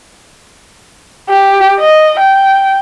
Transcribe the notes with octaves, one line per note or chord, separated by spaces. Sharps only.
G4
D#5
G5